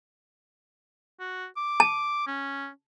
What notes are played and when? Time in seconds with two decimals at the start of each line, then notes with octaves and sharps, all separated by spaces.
1.20 F#4
1.57 D6
1.80 A5
2.27 C#4